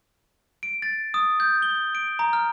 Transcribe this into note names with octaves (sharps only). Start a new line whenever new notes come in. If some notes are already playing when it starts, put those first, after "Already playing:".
D7
A6
D#6
G6
G7
D7
A#5
F6